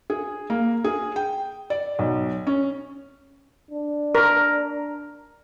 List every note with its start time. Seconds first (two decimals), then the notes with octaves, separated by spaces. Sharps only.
0.10 G#4
0.50 A#3
0.84 G#4
1.16 G5
1.70 D5
1.99 B1
2.47 C#4
3.71 D4
4.15 A#4